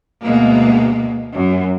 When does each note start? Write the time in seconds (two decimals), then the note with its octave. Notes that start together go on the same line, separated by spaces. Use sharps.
0.24 D2 B2 G#3 A#3
1.34 F#2